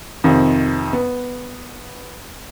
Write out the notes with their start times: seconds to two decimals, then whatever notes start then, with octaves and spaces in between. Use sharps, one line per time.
0.24 F2 C3 D#3
0.93 B3